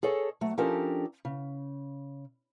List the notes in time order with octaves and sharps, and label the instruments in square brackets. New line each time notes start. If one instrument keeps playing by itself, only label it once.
[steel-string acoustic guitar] G#4 A4 C#5 D#5 A5
F#3 A3
F3 C#4 D4 G4 A4 A#4
C#3